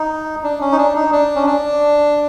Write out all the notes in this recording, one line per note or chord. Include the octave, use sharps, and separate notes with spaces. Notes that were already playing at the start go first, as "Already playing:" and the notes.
Already playing: D#4
D4
C#4
D#4
D4
D#4
D4
C#4
D4